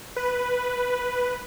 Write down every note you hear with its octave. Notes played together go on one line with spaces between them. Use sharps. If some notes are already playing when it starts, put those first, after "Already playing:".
B4